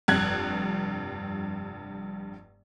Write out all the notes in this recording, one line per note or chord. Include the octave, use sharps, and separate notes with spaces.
F1 G2 F#6 G#6